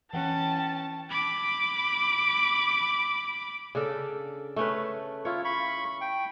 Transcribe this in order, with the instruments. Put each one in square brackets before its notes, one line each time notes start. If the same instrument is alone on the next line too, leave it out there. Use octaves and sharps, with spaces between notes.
[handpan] E3 F#5 [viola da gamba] C#4 [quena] G5 [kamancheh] A5
[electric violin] B5 D6
[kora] C#3 D4 A4
A3 C#4 B4
[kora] E4 C#5 [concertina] F4
[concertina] B5 C#6
G5